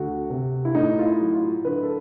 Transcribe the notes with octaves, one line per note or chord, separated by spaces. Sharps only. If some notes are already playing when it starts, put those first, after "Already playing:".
Already playing: D2 F#4
C3
E4
A2 D#4
F4
E4
F#3
F4
D3 B4
A4